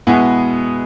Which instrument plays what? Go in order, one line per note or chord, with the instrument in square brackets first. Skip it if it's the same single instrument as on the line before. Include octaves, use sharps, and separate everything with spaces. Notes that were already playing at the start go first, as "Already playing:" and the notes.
[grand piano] B2 G#3 B3 E4 G#4